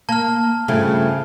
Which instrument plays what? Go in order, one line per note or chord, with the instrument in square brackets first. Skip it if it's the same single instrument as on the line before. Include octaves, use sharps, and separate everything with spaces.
[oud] A#3 [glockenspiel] A5 F6
[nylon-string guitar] G2 F3 A3 [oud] C#3